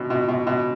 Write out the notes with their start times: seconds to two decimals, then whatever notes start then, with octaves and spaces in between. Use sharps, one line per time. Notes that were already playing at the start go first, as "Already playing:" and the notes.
Already playing: B2
0.10 B2
0.28 B2
0.47 B2